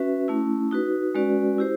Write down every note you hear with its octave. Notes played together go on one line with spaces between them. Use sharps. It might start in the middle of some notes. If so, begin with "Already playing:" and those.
Already playing: C#4 F#4 B4 E5
A3 C#4 E4
D#4 F#4 B4
G#3 C#4 F#4 B4 D5
E4 G4 C5